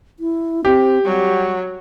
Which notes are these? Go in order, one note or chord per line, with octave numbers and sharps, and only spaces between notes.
E4
C4 G4
F#3 G3